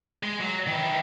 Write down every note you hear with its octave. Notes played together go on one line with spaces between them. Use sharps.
G#3
F#3
D#3 E3